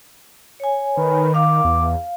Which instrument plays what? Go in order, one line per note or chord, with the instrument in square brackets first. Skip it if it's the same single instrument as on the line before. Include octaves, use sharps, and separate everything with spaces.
[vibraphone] C#5 G#5
[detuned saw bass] D#3 [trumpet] B4
[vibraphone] F5 [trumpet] D6
[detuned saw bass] E2